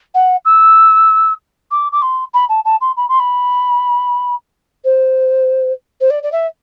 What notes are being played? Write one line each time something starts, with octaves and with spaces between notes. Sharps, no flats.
F#5
E6
D6
D6
C6
B5
A5
A5
C6
B5
C6
B5
C5
C5
D5
D5
E5